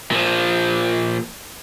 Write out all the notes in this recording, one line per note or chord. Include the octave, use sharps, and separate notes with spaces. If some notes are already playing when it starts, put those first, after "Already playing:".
A#2 F3